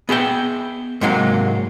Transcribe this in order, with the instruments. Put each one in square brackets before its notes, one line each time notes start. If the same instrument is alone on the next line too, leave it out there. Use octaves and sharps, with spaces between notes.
[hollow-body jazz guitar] B3 G#4 E5 G5
G#2 C3 F#3 G#3 A#3